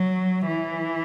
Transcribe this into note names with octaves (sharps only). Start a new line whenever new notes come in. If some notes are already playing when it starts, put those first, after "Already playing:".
Already playing: F#3
E3